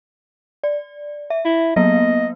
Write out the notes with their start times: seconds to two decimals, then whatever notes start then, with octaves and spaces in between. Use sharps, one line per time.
0.63 D5
1.30 E5
1.45 E4
1.76 F#3 A#3 B3 D#5